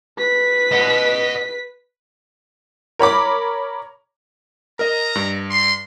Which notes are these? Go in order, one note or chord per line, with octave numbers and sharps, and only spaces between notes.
B4 B6
D#5 F#5
A#4 C#5 B5 D6
A#4 D#5 A#5
G2
C6